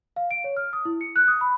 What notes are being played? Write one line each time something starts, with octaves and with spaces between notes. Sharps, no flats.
F5
D7
C#5
F6
D#6
E4
C#7
F#6
D#6
B5